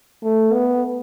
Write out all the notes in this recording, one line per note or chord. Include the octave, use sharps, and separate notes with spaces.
A3
B3